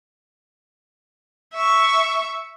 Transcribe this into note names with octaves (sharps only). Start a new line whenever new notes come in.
E5 C#6